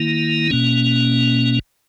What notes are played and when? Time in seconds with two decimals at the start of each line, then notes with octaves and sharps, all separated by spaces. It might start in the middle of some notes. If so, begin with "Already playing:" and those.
Already playing: D#3 A#3 E4
0.50 B2 A#3 C#4